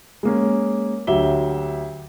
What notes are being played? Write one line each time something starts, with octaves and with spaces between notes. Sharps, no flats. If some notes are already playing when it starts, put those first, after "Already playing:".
G#3 A#3 C#4
D2 F#3 G4 E5 G7